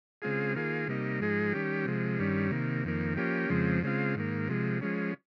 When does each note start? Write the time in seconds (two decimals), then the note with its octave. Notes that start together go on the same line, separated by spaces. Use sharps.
0.22 C#3 G#3 C4 F4 G#4
0.55 D#3 A#3 F4 G#4
0.88 C3 G3 A#3 D#4
1.20 G#2 F3 G#3 D#4 G#4
1.53 D#3 G3 C#4 G4
1.85 C3 F3 G#3
2.19 G2 D#3 G3 C#4
2.51 C3 D#3 A#3
2.84 F2 D#3 A#3
3.17 F3 A#3 C#4 G4
3.50 F2 C#3 F3 G#3 C4
3.83 C#3 G#3 C4 F4
4.15 G#2 D#3 A#3
4.48 C3 F3 G#3
4.81 F3 G#3 C#4